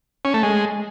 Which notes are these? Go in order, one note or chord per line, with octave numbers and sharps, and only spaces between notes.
C#4
A3
G#3